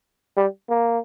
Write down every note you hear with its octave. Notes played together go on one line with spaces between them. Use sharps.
G3
A#3